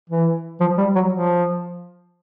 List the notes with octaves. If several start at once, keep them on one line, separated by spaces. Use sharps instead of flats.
E3
F3
G3
F#3
F3